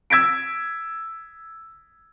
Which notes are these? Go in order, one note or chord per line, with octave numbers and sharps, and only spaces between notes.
E6 G#6 B6 D7